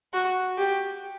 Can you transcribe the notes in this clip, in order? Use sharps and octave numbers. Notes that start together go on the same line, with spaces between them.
F#4
G4